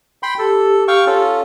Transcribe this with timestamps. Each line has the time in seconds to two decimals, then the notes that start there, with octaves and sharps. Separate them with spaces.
0.23 G5 B5 C6
0.38 G4 A4
0.88 F5 G5 C#6
1.07 C#4 F4 A4